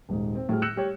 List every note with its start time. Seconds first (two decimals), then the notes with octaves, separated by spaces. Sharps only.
0.09 D#1 G#2 G#3
0.35 C4
0.49 A2 F#3 G3 G#4 F6
0.62 E6 F#6 G6 A#6 C#7 E7
0.76 G3 G4 C#5